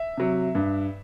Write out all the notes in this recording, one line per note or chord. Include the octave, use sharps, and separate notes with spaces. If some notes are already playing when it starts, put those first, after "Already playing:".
Already playing: E5
C3 F#3
G2